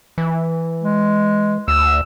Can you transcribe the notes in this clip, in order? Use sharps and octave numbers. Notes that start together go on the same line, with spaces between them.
E3
G#3
D2 E6